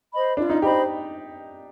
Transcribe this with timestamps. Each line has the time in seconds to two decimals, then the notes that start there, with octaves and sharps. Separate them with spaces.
0.13 C5 D#5 B5
0.37 D4 F4
0.50 D#4
0.62 G4 C5 D#5 B5